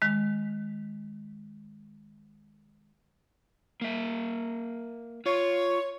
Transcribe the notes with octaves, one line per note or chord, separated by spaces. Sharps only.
D#3 G#3
A#3 E5
F4 C#5